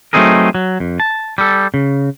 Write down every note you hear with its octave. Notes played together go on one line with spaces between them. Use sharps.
F#3 A3 C4 D#4 G#4 A#4
F#3
F2
A5
G3 A4
C#3